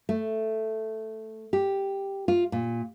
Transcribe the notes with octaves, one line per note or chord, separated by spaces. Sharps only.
A3
G4
F4
A#2